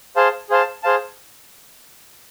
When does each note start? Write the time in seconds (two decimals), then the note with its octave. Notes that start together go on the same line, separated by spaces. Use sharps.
0.16 G#4 C5 F5 A5
0.50 G#4 C5 F5 A5
0.83 G#4 C5 F5 A5